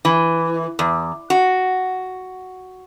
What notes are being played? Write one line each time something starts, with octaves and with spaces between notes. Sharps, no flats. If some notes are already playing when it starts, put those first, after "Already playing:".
E3
E2
F#4